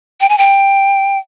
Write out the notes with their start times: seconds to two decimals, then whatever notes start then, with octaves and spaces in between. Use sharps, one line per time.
0.21 G5
0.29 G#5
0.38 G5